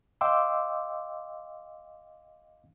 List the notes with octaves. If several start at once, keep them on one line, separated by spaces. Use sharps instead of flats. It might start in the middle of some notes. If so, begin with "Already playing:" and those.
D#5 F5 G5 C6 D6 E6